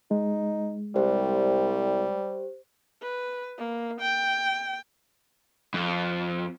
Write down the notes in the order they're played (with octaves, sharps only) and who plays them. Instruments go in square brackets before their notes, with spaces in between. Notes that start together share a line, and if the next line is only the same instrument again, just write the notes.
[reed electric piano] G#3 [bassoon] D#4
[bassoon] C2 [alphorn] G3 [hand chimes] G4 C5
[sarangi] B4
A#3
G5
[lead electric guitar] F2